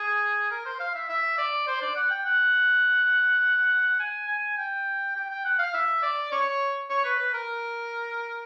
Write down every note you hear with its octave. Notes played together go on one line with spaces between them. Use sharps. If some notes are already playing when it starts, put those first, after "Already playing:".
Already playing: G#4
A#4
C5
F5
E5
E5
D5
C5
D5
F#5
G5
F#5
G#5
G#5
G5
G5
G5
F#5
F5
E5
D5
C#5
C#5
B4
B4
A#4